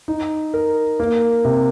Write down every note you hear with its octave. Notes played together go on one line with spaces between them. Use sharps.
D#4
A#4
A#3
C3